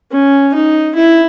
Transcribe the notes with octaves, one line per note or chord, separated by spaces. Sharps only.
C#4
D#4
E4